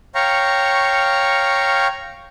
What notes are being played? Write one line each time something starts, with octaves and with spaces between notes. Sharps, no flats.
C#5 F5 G5 A#5 C#6